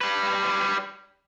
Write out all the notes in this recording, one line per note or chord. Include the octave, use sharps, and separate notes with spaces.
G3 B4